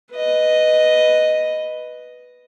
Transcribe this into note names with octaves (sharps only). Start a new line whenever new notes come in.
B4 D#5